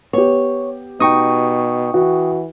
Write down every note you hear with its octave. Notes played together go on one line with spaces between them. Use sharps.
B3 G4 C#5
B2 D#4 G5 C#6 D#6
E3 F#4